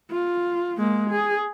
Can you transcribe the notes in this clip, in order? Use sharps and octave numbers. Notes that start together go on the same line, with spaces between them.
F4
G#3 A#3
G#4